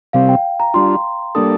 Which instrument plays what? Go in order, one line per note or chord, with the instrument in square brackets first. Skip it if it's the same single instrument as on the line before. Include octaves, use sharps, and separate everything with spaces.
[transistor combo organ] C3 G3 C4 [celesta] F5
[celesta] G5
A#5
[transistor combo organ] G3 D4 F4 [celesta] C6
[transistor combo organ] G3 A#3 D4 A4 [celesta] D#6